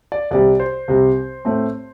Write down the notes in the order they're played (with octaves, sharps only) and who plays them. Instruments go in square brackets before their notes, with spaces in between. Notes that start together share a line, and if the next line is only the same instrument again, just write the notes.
[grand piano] D5
C2 C3 G3 D5
C5
C2 C3 G3
A2 A3 C4